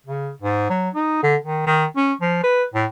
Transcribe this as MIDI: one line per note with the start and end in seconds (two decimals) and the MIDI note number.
0.06 0.30 49
0.42 0.65 44
0.70 0.89 54
0.94 1.19 63
1.23 1.36 50
1.44 1.65 51
1.66 1.86 51
1.96 2.13 61
2.21 2.42 53
2.43 2.64 71
2.74 2.86 45